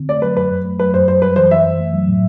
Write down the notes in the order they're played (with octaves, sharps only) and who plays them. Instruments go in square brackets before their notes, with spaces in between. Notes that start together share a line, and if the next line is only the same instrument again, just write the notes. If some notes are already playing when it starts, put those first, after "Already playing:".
Already playing: [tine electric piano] D3 C4
[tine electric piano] A3 [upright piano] D5
[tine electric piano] F#3 [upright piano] B4
[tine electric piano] F#2 [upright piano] B4
[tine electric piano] F#2
A3
[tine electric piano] F#3 [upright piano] B4
[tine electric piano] F#2 [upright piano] C5
[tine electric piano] F#2 [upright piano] C5
[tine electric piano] G3 [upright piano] B4
[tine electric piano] E3 [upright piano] C5
[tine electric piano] F#2 [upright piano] E5
[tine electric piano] F#2
A3
F#3
A2